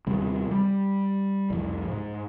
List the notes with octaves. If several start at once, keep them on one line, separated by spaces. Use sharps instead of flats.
D#2 C3 G3
G3
C2 F2
G#2